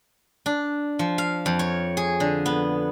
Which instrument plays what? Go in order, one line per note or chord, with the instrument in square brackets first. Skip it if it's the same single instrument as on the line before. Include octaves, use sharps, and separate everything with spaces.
[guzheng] D4
F3
F5
F2
C#5
G#4
D3
B3